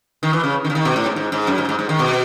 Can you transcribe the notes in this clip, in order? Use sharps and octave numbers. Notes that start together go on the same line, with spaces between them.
D#3
E3
C#3
D#3
C#3
D#3
B2
A2
G#2
G#2
G#2
F#2
G#2
G#2
G#2
D#3
B2